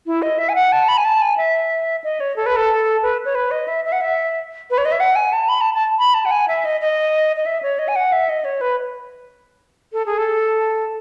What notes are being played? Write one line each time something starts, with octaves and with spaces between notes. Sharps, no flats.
E4
D#5
E5
G#5
F#5
A5
B5
G#5
A5
G#5
E5
D#5
C#5
A4
B4
A4
B4
C#5
B4
D#5
E5
E5
F#5
E5
B4
C#5
D#5
E5
F#5
G#5
A5
B5
A5
A5
B5
A5
F#5
G#5
E5
D#5
D#5
D#5
E5
C#5
D#5
G#5
F#5
E5
D#5
C#5
B4
A4
G#4
A4